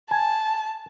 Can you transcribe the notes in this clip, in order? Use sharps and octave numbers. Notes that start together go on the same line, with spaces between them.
G#5 A5